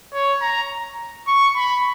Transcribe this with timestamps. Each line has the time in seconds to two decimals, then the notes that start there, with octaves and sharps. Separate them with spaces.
0.13 C#5
0.41 A#5
1.27 C#6
1.56 B5